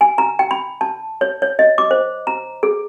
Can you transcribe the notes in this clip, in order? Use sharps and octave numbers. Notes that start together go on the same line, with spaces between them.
G#5
A#5
G5
B5
A5
C#5
C#5
D#5
D6
C5
A#5
G#4